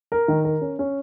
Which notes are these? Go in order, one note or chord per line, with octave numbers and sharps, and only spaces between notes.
A#4
D#3
A#4
C#4
C#4